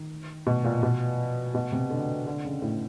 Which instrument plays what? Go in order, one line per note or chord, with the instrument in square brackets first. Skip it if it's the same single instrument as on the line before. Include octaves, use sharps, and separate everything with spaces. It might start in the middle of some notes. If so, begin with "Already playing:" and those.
Already playing: [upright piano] D#3
B2
A#2
B2
B2
C3
D3
D3
C#3
A2